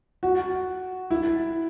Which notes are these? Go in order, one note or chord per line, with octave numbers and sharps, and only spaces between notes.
F#4
E4